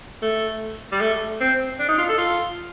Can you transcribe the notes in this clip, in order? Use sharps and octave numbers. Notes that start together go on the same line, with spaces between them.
A3
G3
A3
C4
D4
D#4
F4
A4
F4